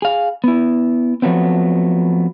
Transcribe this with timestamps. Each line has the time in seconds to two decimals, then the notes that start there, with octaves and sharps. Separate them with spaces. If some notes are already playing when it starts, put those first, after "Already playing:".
0.02 G#4 F5
0.44 B3 E4
1.22 F3 F#3 A3 B3 C4